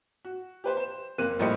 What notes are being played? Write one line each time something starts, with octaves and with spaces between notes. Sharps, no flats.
F#4
G4 B4 C5
C5 E7
F#1 A#3 C4 F#6 D#7
A#1 A2 G3 C5 D#5 C#7